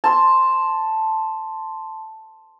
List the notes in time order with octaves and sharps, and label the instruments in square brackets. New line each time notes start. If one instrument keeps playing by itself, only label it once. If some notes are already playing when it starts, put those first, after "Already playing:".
[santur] A5 C6